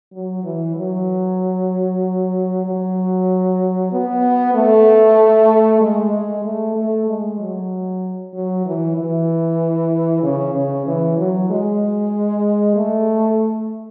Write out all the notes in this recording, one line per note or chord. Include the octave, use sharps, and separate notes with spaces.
F#3
E3
F#3
F#3
B3
A3
G#3
G#3
A3
A3
G#3
F#3
F#3
E3
E3
C#3
C#3
E3
F#3
G#3
A3